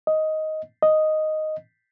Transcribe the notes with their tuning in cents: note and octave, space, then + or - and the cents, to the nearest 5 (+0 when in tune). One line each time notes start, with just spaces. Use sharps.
D#5 +10
D#5 +0